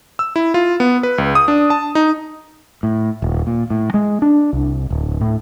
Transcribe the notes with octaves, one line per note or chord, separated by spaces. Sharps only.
E6
E4
F4
B3
B4
C#2
D#6
D4
A5
D#4
A2
D#1
A#2
A2
G#3
D4
C2
D1
A2